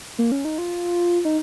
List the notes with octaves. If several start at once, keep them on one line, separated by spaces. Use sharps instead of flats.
A#3
C#4
D#4
F4
D#4